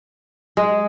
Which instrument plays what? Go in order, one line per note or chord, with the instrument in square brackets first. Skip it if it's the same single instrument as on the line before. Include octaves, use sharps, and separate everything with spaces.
[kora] G#3